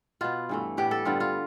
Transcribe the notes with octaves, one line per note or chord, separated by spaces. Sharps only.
B2 B3 F4
G2 E3 A3
A2 G3 B3 G4
A4
G2 D3 G3 B3 F4
F4